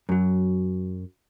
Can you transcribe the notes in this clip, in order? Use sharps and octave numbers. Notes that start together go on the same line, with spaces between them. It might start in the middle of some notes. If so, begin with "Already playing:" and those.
F#2 F#3